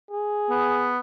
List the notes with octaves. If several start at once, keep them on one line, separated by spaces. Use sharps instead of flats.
G#4
B3